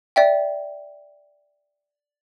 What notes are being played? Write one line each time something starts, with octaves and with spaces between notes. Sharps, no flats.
D5 E5 G5